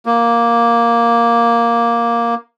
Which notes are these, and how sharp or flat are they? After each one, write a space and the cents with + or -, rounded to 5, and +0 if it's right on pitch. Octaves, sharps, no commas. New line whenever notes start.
A#3 +5